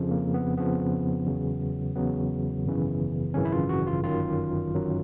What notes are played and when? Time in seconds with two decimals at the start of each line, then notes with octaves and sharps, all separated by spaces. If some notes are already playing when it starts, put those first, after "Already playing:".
Already playing: F2 C#3 F3
0.11 A#3
0.34 B3
0.57 F2 C#3 F3 B3
1.27 E2 C#3 F#3
1.96 E2 C#3 F#3 B3
2.65 G#1 F#2 C#3 E3
3.34 G#1 F#2 C#3 E3 C#4
3.45 E4
3.52 F4
3.69 F#4
3.87 F4
4.03 G1 F#2 D#3 F#3 F4
4.72 G1 F#2 D#3 F#3